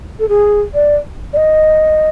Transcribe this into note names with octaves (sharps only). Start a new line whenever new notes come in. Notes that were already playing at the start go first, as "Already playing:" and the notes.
A4
G#4
D5
D5
D#5